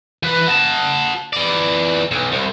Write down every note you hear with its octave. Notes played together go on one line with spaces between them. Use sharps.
E3 B4
F#4 A5
E3 D5
B1
C2